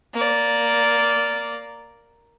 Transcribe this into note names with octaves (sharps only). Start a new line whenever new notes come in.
A#3 D5